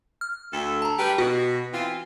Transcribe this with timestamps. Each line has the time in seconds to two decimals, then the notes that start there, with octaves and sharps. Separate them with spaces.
0.21 F6
0.53 D2 A4
0.82 A5 A#5
0.99 G3 G4 B4
1.18 B2 F#4
1.73 E3 C4 F4